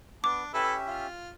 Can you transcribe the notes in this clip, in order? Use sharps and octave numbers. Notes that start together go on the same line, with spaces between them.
B3 D4 D6
C#4 E4 G4 A4 B4 E5
F4